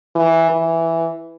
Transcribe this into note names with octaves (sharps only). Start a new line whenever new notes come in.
E3
E3